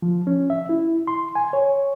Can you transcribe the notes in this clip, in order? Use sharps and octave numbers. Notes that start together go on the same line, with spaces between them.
F3
C#4
E5
E4
C6
G#5
C#5